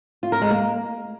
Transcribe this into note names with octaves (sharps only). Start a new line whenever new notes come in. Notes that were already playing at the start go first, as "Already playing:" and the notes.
F4
A#4
G#3
A#3